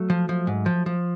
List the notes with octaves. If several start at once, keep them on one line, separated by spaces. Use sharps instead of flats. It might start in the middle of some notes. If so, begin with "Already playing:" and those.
Already playing: F#3 A3
F3
F3
G#2
F3
F3